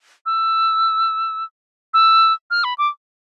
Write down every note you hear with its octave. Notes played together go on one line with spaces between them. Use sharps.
E6
E6
F6
B5
D6